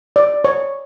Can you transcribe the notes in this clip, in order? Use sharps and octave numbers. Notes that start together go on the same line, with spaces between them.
D5
C#5